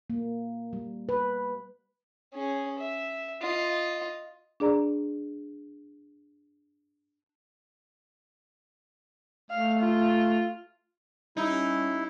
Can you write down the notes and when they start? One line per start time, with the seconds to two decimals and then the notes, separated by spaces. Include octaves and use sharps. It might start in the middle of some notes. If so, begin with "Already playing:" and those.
0.10 A#3
0.73 G3
1.09 B4
2.34 C#4 G#4
2.79 E5
3.42 F4 D#5
4.60 D4 G#4 D5 A#5
9.51 A3 F5
9.79 F4
11.37 G3 C#4 D#4 E4